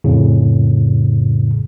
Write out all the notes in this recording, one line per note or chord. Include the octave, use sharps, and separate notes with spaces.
F2 A2 C#3